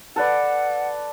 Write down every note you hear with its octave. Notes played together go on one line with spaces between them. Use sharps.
A4 B4 D5 F#5